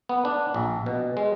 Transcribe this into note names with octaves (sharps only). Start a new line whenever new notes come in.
B3
D4
A#1
B2
G#3